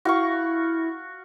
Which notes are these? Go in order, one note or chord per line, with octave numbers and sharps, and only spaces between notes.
E4 F#4 F5 C#6